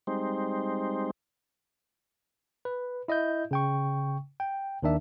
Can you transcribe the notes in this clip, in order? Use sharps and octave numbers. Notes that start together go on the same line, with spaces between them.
G3 G#3 C4 D#4 C5
B4
E4 D#5 E5 G6
C#3 G5 C#6
G5
D#2 D#3 D4 E5